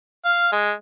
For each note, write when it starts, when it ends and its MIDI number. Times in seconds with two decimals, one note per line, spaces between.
0.25 0.50 77
0.52 0.72 56